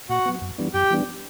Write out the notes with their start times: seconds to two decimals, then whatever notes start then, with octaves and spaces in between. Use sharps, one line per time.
0.09 A#2 F#4 F#5
0.26 F#3 B3
0.42 F#2
0.58 E3 G3 B3 D4
0.74 F#2 G4 G5
0.91 E3 G3 B3 D4